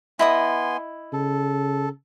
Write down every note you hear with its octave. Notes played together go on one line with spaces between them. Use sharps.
B3 E4 D#5 G#5 C6 D#6
C#3 A4